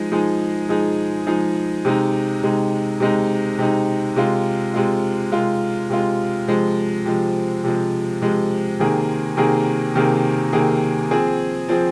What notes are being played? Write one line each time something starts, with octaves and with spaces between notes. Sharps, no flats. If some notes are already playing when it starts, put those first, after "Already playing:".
Already playing: F3 G#3 D#4 G#4
F3 G#3 D#4 G#4
F3 G#3 D#4 G#4
F3 G#3 D#4 G#4
C3 G#3 D#4
C3 G#3 D#4
C3 G#3 D#4
C3 G#3 D#4
C3 G#3 F4
C3 G#3 F4
C3 G#3 F4
C3 G#3 F4
C3 F3 G#3
C3 F3 G#3
C3 F3 G#3
C3 F3 G#3
C3 D#3 A#3 G#4
C3 D#3 A#3 G#4
C3 D#3 A#3 G#4
C3 D#3 A#3 G#4
F3 C4 G#4
F3 C4 G#4